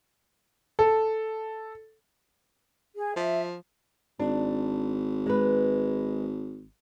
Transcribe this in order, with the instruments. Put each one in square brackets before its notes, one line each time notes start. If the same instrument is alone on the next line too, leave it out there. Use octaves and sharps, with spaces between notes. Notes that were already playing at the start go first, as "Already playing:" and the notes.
[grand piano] A4
[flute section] G#4
[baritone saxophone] F3 [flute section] E5
[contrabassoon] G#1 [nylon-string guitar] D4
[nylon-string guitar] G#3 B4